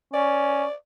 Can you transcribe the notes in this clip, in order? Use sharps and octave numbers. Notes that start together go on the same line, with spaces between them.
C#4 D5